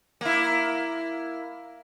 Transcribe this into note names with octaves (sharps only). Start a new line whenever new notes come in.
A#3 E4